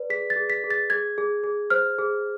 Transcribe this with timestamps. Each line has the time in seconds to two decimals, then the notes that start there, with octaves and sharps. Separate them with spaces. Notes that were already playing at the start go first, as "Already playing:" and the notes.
Already playing: B4 D5
0.10 G#4 B6
0.30 A6
0.36 G#4
0.50 B6
0.64 G#4
0.71 A6
0.90 G#4 G#6
1.18 G#4
1.44 G#4
1.70 C5 F6
1.99 G#4